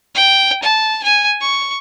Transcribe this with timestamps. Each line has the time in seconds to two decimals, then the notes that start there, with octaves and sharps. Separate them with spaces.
0.15 G5
0.63 A5
1.03 G#5
1.41 C#6